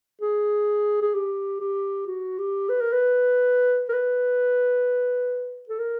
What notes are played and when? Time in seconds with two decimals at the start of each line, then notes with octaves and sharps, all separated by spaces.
0.21 G#4
1.02 G#4
1.14 G4
1.60 G4
2.07 F#4
2.38 G4
2.69 B4
2.81 A#4
2.93 B4
3.89 A#4
3.93 B4
5.69 A4
5.79 A#4